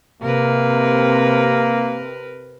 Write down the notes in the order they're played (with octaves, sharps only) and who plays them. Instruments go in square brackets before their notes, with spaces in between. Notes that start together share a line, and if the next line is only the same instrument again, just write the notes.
[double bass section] C3 [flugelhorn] A#3 [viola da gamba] A#4 B4